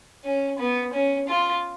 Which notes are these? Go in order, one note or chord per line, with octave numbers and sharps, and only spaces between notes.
C#4
B3
C#4
F4